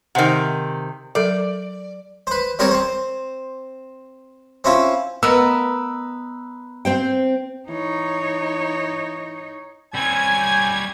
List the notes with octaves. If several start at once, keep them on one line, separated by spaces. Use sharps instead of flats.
C3 D#3 C5 F#5
F#3 A4 A#4 D5
B4 C5
G3 C4 A#4 C#5 D5
C4 C5
C4 C#4 E4 F4
B3 A#4 B4 D#5 E6
C4 C5 G5
E3 D#4 C#5
G3 C4 C#4 G#5 G#6
G5